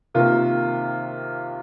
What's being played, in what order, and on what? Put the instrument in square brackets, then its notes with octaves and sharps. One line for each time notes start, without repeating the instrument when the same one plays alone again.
[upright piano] C3 D#3 A#3 F4